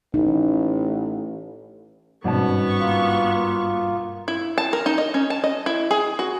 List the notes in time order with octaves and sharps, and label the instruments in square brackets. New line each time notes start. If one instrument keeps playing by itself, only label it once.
[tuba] A1 [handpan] D#4
[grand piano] G#1 B2 C#4 [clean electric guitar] G2 A5 [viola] B3 C#6
[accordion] A#3 F4
[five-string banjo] E4
A5
A#4
D#4
D#5
C#4
A5
D#5
E4
G#4
F#4